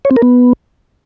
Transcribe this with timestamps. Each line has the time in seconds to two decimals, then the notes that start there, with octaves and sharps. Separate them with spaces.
0.05 C#5
0.11 C4
0.16 A#4
0.22 B3